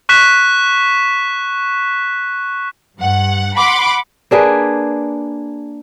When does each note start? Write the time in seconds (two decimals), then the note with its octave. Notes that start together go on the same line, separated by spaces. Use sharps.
0.09 C#6 F#6 B6 E7
2.98 G2 F#5
3.56 F#5 B5 C6 D6
4.31 A#3 D4 G#4 B4